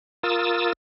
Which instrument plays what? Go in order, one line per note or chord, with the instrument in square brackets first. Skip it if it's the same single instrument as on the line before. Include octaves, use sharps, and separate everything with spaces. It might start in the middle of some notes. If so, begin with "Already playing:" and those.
[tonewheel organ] F4 A#4 D#6 E6 A6